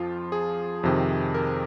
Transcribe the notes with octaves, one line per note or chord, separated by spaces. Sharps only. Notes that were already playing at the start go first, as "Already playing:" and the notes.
Already playing: F2 F3 F4
G#4
F2 C3 D#3
A#4